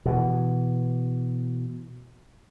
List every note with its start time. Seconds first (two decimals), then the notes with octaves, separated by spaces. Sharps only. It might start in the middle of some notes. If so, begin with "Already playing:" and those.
0.06 B2 E3